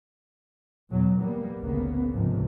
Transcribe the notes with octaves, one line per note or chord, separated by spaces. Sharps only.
E2 B2 F#3
G3 A#3 B3
G#1 D2 C#3 A#3 B3
C#2 G#2 C3 F3